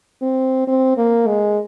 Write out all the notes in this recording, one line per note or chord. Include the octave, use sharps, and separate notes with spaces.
C4
C4
A#3
G#3